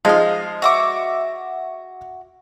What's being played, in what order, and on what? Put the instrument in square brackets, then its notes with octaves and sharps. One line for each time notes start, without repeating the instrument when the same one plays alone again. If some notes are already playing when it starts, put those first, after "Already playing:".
[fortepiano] F3 G#3 D#4 [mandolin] D#5 F5
[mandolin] F#4 E5 D6